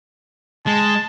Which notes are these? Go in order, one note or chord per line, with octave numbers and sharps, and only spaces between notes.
G#3 A5